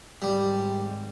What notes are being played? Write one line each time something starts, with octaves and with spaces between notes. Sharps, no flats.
G#1 G3